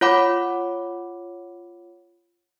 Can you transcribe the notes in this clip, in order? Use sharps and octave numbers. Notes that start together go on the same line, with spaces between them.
F4 C#5 F#5 B5 D6